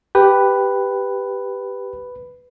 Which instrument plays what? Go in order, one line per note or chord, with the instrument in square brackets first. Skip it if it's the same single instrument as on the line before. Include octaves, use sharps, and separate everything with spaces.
[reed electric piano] G4 [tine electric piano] B4